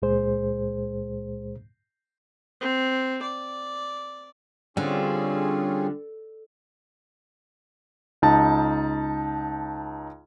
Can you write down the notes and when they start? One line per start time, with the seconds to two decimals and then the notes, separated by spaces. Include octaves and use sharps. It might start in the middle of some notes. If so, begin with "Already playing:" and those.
0.02 C#2 A#2 G#3 G#4 C5
2.61 C4
3.22 D5
4.77 D3 G3 C4 C#4 F4 G#4
8.22 C#2 D#4 A5